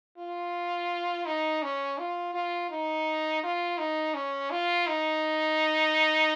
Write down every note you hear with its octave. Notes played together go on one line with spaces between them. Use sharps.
F4
D#4
C#4
F4
F4
D#4
F4
D#4
C#4
F4
D#4